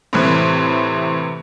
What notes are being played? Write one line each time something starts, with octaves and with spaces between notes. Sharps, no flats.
A2 C3 E3